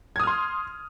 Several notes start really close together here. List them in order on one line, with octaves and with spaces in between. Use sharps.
G#6 D#6 F6 C6